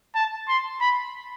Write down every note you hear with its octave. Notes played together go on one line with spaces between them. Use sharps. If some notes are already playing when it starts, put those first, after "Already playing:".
A5
C6
B5